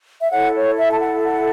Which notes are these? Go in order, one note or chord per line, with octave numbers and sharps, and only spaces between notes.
E5
E4 A4 C#5 F#5
C#5
E5
A5
F#5
F#5